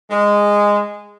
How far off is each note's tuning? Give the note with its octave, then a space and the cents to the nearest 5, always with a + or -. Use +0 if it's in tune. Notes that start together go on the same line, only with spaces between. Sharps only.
G#3 -10